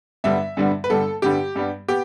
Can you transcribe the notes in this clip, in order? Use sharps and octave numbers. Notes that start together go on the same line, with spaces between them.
G2 D3 G3 B3 E5
G2 D3 G3 B3
B4
G2 D3 G3 B3 A4
G2 D3 G3 B3 G4
G2 G3 B3
B3 G4